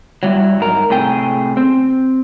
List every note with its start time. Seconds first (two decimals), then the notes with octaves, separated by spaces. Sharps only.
0.23 F#3 G3 E4
0.60 G#2 A#4
0.90 A2 C3 G#4 G5
1.57 C4